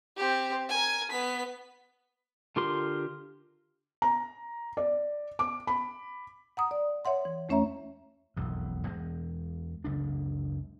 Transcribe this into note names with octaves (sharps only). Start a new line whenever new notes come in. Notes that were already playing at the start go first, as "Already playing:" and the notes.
C4 G4
A#4 G#5
B3 B6
D3 F4 G4 A#4 C6
A#5
D5
D6
B5
F#5 A#5 D#6
D5
C#5 E5 F#5 C6
E3
E2 A3 C#4 C#5 E5 A#5
E1 B1 F2
E2 G#3
F#1 C#2 D4